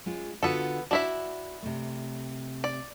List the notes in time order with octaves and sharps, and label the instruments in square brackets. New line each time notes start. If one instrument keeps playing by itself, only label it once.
[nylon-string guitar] G#3 C#4 F4
[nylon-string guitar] D3 F4 F#4 [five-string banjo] B3 A4
[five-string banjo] D4 E4 E5 [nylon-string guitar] F#4
[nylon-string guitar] C3 A3
[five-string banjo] D5